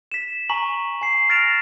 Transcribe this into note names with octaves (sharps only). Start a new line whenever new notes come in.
B6 E7
G#5 A#5 C#6 B6 F#7
G#5 C7
F6 A6 A#6 D7 E7 F7